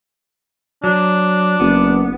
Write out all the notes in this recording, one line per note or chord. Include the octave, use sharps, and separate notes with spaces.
F#3 D4
F#1 B3